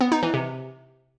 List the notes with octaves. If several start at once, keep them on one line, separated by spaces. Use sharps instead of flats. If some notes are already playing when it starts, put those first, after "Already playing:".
B3
D#4
E3
C3